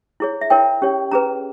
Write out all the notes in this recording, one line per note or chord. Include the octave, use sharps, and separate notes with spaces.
E4 G#4 C#5
E5
E4 A#4 C#5 G5
C#4 G4 C#5
C#4 G#4 B4 A#5